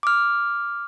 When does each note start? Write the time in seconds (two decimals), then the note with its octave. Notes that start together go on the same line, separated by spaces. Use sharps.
0.03 D6 F6